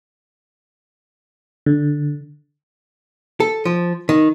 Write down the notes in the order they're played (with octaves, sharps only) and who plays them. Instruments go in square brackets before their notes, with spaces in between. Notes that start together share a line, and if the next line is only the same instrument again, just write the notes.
[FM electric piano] D3
[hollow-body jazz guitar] A4
F3
D#3